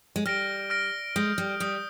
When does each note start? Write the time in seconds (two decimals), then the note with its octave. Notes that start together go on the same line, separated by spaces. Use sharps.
0.16 G#3
0.26 G3 F6 A#6 D7
0.70 F6 A#6 D7
1.16 G#3 D#6 G6 A#6
1.38 G3
1.60 G3 D#6 G6 A#6